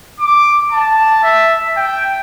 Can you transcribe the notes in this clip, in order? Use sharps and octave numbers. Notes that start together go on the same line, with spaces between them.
D6
A5
E5
G5